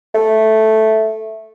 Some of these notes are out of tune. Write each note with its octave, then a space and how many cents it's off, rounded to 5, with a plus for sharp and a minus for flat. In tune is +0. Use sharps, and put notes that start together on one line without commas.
A3 -5